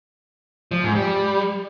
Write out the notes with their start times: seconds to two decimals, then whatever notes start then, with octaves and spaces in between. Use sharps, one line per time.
0.71 F3
0.83 G#2
0.95 G3